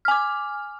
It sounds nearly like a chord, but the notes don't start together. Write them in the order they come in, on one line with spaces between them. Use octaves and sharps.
F6 G#5 D6